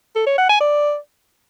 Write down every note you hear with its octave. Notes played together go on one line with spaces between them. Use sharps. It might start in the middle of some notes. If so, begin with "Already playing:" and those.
A4
C#5
F#5
G#5
D5